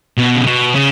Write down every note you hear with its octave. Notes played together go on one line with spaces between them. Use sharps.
B2
C#3
B2
C#3